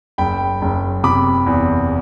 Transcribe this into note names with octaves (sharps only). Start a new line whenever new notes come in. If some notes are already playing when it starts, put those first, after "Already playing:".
F#1 G5 B5
F#1
C3 B5 D6
E2